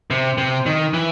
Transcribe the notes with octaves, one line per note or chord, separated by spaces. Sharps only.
C3
C3
D#3
E3